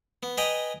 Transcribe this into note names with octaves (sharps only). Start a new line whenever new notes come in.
B3
B4 D#5 G5 G#5 A#5